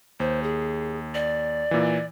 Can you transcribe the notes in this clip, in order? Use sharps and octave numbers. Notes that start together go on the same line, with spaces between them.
D#2 C5
G#4
D5
A#2 E3